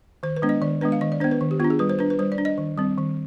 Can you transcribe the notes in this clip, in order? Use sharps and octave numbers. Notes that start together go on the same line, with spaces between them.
D#3 C5
B4
G#3 B3 D4
D#5
D#3 D5
G#3 B3 D4 B4
F5
D#3 D#5
D5
B3 D4 C5
B4
D#3
G4
B3 D4 F4
G#4
G3 B4
C5
D4 B4
B4
G3 C5
D5
D4
D#5
D#3
G3 C4
D#3